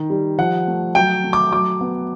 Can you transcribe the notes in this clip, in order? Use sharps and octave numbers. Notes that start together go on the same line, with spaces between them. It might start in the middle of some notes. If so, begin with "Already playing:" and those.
Already playing: D#3
G3
F3 F#5
A3
F#3 G5
A3
D6
F#3 D6
B3